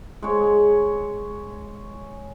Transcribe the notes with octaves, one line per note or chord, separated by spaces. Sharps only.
G#3 C#5